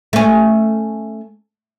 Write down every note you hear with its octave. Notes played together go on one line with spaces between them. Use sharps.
A3 C#4